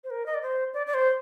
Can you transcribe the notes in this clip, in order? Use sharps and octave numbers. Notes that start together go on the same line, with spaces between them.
C5
A#4
D#5
D5
C5
D5
D5
C5